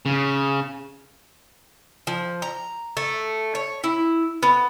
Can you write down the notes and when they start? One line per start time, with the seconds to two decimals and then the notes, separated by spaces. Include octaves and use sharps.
0.06 C#3
2.07 F3
2.42 A#5
2.97 A3
3.55 C#5
3.84 E4
4.43 B3